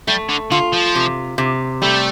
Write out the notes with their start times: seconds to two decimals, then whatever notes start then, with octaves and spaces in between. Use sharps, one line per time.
0.07 G3 A3
0.29 D3
0.52 D3 F4
0.73 F3
0.96 C3
1.38 C3
1.82 G3 A3